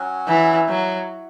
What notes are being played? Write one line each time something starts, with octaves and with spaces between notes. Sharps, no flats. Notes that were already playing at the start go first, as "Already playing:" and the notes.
Already playing: F#3 C#4 F#4
E3
F#3